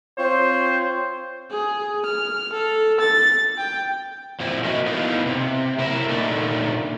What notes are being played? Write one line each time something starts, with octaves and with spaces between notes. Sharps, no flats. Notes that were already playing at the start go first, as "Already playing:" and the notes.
C4 F4 C5 C#5
G#4
F6
A4
A6
G5
A#2 F3 C4 E4
F#4 A#4 B4 D#5 E5
A3 B3 D#4 E4 B4 F5
C3
A#3 E4 A#4 D5 E5
A#2 D3 D#3 A3